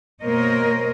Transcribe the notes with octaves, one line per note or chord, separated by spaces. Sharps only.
B2 A#3 A#4 C5 C#5 D#5